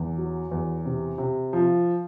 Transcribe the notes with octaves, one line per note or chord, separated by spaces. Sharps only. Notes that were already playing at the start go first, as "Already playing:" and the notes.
Already playing: E2
F#3
E2
C3
C3
F3